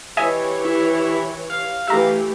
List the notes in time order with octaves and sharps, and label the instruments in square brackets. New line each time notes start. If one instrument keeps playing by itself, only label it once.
[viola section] E3 G4 C#5 [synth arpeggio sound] D#5 E5 G#5
[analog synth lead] E4
F5
[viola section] E3 A3 G4 [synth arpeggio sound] E5 A#5